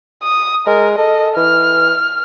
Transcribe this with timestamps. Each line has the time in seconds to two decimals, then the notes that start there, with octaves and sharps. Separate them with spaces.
0.23 D#6
0.67 G#3 A#4
0.98 A4 D#5
1.37 E3 F6